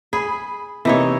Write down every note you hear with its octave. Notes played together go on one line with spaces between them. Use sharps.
G#4 B5
C3 E3 A#3 D#4 C#5